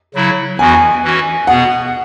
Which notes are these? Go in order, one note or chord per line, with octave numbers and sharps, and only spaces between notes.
C#3 F#3 E4
E2 E3 B3 F#4 G#5
G#5
E3 C#4 F#4
B2 B3 G#4 F#5